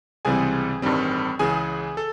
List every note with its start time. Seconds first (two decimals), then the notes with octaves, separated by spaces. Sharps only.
0.25 C#2 C3 E3 G3 C4 G#4 G#5
0.82 A1 G2 D#3 G3 C4
1.39 C#2 C#3 E3 G#4 G#5
1.97 A4